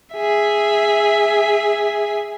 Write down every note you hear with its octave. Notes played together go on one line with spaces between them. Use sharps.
G#4 E5